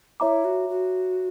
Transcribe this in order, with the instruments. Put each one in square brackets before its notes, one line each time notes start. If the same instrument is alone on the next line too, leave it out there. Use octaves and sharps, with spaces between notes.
[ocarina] E4 [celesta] C#5 E5 A#5 D6
[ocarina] F#4
F#4